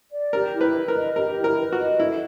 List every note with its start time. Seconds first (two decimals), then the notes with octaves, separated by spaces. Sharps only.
0.12 D5
0.33 G4 A#4
0.54 E4
0.61 B4
0.75 B4
0.88 A#4
0.95 D#5
1.16 G4 A#4
1.37 E4
1.44 A#4
1.58 B4
1.72 F#4
1.79 D#5
2.00 E4 A4